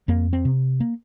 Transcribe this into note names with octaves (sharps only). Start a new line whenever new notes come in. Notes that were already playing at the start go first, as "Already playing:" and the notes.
F2 A#3
C4
C3
A#3